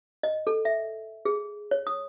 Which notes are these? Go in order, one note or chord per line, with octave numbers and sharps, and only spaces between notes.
D#5
A4
E5
G#4
C#5
D#6